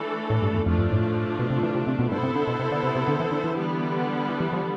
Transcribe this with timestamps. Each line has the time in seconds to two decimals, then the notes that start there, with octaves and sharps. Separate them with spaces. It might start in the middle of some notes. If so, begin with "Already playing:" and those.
Already playing: E3 A3 D4 A4
0.30 A2
0.42 G2
0.54 E2
0.66 F2 F3 A3 D4 F4
0.79 G2
0.91 A2
1.39 B2
1.50 C3
1.63 E3
1.75 C3
1.87 C3
1.99 B2
2.11 G2 B3 E4 A4 C5
2.23 C3
2.35 D3
2.47 B2
2.59 C3
2.71 D3
2.83 C3
2.96 C3
3.08 D3
3.20 E3
3.32 D3
3.44 E3
3.56 D3 G3 B3 D4 G4
4.29 E3
4.40 E3
4.53 F3